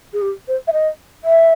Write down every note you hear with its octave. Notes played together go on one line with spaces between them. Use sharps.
G#4
G4
C5
E5
D#5
E5